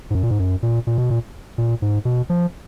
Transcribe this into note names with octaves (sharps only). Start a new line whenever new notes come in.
G#2
F#2
A#2
G#2
F#2
A#2
A#2
B2
A#2
A#2
G#2
B2
F3